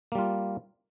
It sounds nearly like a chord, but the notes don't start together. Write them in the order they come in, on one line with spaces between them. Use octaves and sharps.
A#3 G3 F4